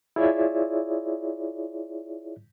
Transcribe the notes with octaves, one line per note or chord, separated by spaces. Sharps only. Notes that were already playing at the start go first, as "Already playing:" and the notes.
E4 F4 G#4 C#5 D5 E5